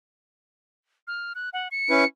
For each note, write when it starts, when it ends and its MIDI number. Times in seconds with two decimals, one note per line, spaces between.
1.07 1.33 89
1.35 1.50 90
1.53 1.68 78
1.71 2.07 97
1.90 2.04 61
1.90 2.04 64
1.90 2.04 71